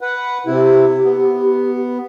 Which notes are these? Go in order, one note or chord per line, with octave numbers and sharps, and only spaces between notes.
B4 F#5
C3 E4 G4
B3